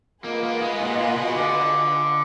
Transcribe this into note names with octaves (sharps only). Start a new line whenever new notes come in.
A#3 F4 G#4 B4 D#5 F#5
A#3
G#3
A#2
A#2
B2
D3